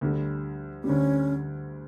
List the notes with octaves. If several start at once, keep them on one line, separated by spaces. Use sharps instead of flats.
D2 D3 G3
D2 D3 G3 C#4